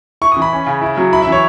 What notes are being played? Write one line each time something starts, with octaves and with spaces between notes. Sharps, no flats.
E4 C#6
D#6
E3
B5
C#4
C#3
E4
F#3
E4 B5
E5
E3 C#5